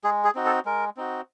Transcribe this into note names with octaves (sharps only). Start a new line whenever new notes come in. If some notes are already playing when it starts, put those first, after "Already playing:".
G#3 G#4
G#4
C4 D#4 F#4
A4
G#3 A#4
C4 D#4 F#4